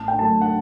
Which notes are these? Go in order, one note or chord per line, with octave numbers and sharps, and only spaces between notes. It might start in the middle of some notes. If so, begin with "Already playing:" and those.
Already playing: A1 A5
G5
A2 F#3 A3 A5
F#5